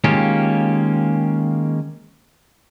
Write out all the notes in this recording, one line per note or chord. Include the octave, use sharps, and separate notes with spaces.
D#3 G#3 A#3 C#4 F4 G4